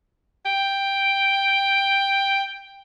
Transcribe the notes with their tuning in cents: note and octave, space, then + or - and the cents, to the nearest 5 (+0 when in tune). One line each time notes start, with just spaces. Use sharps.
G5 +5